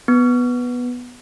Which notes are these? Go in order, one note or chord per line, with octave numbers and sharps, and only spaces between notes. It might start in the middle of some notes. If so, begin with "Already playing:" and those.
B3